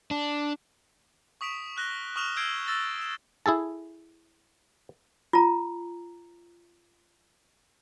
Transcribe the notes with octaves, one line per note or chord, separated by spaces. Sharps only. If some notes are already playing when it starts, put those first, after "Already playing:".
D4
C#6 D#6 B6 D7 F7
F6 F#6 A#6 G7
C#6 D#6 F6 E7 F7 G7
E6 G6 G#6 C7 D7 G7
E6 A6 A#6
E6 E7
E4 G#4 A4 A5
F4 A#5